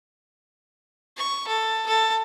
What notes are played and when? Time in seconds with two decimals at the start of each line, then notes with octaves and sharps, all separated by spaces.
1.17 C#6
1.48 A4
1.87 A4